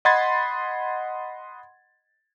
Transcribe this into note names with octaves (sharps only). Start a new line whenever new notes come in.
D#5 F#5 B5 C6 G#6 A6